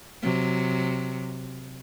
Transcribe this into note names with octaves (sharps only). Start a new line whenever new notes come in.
C3 F#3